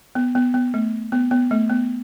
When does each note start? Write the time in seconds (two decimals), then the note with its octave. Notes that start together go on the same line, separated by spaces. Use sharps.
0.15 B3
0.35 B3
0.54 B3
0.74 A3
1.12 B3
1.31 B3
1.51 A3
1.70 B3